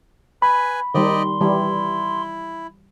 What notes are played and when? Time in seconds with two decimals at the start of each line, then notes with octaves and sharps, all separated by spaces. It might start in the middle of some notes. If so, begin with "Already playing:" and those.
0.42 B4 G#5 B5
0.95 D#3 G3 G4 D5 D#5 C6
1.41 E3 G3 E4